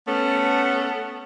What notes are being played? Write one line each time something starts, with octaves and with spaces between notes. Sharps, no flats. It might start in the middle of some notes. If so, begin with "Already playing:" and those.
A3 B3 C#4 A4